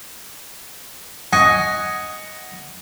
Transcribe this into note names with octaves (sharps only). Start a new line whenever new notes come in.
D#5 F#5 G#5 C#6